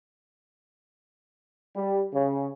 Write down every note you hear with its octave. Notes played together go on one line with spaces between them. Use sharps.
G3
C#3